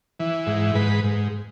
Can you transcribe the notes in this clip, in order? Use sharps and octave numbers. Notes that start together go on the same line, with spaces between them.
E3
G#2
G#2 B4
G#2